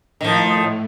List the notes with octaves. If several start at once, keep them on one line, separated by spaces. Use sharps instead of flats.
A2 D#3 F3